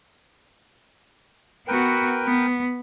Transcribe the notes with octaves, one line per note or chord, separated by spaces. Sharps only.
B3 F#4 A#4 B4 G5
B3